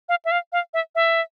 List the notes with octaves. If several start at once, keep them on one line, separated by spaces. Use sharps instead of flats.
F5
E5
F5
F5
E5
E5